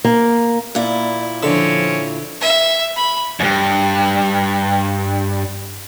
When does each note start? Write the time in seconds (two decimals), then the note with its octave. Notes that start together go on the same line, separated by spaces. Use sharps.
0.05 A#3
0.75 A#2 E4 D5
1.43 D3 F3 C4 C#4 C#5 E5
2.41 E5
2.96 B5
3.40 E2 G2